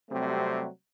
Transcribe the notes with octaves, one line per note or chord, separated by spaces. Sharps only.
C3 F#3 G3 A3 C4